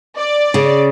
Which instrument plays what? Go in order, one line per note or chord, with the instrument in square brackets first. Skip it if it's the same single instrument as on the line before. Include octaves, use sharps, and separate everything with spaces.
[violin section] D5
[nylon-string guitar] C#3